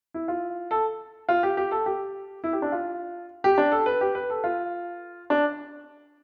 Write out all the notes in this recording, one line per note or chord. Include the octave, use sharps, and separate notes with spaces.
E4
F4
A4
F4
G4
G4
A4
G4
E4
G4
D4
F4
G4
D4
A4
B4
G4
B4
A4
F4
D4